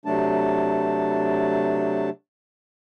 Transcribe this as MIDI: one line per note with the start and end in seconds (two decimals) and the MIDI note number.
0.06 2.10 48
0.06 2.10 54
0.06 2.10 57
0.06 2.10 62
0.06 2.10 81